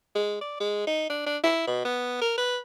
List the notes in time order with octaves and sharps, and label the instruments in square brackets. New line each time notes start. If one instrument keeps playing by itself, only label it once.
[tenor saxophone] G#3
D5
G#3
D#4
D4
D4
E4
B2
B3
A#4
B4